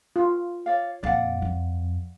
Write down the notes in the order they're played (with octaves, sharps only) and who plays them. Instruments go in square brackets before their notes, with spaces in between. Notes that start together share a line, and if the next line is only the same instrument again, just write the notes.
[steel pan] F4
[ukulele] C#5 D5 F5
[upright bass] F2 A#2 [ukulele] D5 F5 F#5
[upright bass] F2